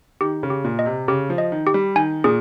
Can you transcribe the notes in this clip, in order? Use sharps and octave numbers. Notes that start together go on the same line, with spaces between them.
D#3 G4
C#3
G4
A#2
D#5
C3
C#3 G4
F3
D#5
D#3
G4
G3
D#3 G#5
A#2 G#4